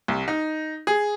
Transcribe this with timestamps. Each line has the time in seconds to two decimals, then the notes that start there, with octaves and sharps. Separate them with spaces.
0.08 C2
0.28 D#4
0.87 G#4